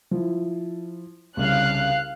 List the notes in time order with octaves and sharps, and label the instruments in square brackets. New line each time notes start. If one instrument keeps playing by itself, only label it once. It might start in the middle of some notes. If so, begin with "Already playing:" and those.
[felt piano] F3 E4
[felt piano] C2 C#3 [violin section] F5 F#6